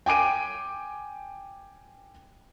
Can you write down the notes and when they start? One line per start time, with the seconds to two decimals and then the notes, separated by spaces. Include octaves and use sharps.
0.06 G5 G#5 D6 D7 D#7